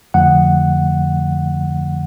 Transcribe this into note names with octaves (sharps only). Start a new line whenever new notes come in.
F2 D3 F3 A3 F#5